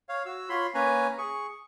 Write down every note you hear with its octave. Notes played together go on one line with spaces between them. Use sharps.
C#5 F5
F#4 E6
F4 C#5 B5 C6
A#3 C#4 B4 C#5 G#5 A#5
G#4 C#6